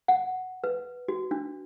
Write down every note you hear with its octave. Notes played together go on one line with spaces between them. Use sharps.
F#5
B4
F#4
D4